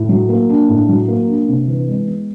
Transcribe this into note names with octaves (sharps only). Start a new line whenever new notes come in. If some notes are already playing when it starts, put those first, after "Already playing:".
Already playing: A2
F#3
A#3
D4
A2
F#3
A#3
D4
C3
E3
G#3
B3